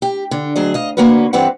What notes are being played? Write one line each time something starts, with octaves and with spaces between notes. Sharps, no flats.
G4
D3
D2 F#3 G#4 D#5
D#5 F5
D3 A#3 C#4 F#4 A#4 B4
G2 E3 C4 G4 B4 F#5